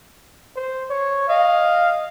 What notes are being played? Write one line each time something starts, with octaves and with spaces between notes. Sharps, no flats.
C5
C#5
D#5 F5